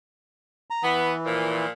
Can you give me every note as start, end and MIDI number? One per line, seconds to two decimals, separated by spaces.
0.70 0.83 82
0.83 1.66 52
0.83 1.13 59
1.26 1.70 46
1.26 1.70 53